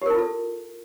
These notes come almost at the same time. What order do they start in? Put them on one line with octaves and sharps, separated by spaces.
G4 A#4 E4 F4 A4